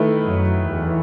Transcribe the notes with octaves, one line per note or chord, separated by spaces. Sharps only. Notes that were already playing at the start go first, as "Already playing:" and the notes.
Already playing: D#3 A3 E4 B4
F#2 F#3
E2 E3